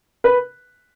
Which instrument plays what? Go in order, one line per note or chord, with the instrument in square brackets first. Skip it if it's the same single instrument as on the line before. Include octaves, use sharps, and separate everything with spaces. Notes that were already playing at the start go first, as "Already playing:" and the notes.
[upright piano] B4